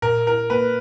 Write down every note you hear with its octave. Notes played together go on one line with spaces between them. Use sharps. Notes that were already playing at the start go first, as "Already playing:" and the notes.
A#2 A#4
E4 A#4
A#3 B4